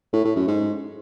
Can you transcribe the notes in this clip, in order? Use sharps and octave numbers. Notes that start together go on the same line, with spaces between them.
A2
A2
F#2
G#2